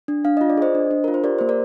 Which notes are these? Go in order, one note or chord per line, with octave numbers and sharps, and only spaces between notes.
D4
D4 F5
F4 D#5
D5
G#4 C5 D#5
D4
D4
F4 A#4
C5
G4 A#4 D5
A#3 C5
A#4 D5